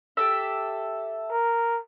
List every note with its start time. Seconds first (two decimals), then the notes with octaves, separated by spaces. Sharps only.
0.17 G4 A4 E5
1.31 A#4